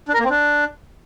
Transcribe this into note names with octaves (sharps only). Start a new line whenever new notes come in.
D4
A#4
A#3
C4
D4